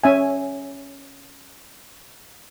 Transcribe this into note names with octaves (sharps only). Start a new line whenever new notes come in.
C#4 E5 G#5